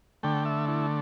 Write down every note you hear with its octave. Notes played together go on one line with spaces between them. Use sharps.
D3 A3 G5
E5
E4